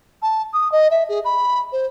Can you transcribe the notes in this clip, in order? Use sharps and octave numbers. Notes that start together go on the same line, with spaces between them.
A5
D#6
D#5
E5
G#4
B5
C5